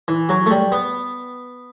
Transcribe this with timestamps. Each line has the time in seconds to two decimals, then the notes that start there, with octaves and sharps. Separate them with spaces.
0.08 E3
0.29 F#3
0.46 A3
0.51 G3
0.72 B3